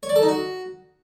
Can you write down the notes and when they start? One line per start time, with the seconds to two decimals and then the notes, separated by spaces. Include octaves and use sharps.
0.03 C#5
0.09 D5
0.16 A4
0.22 D#4
0.28 F#4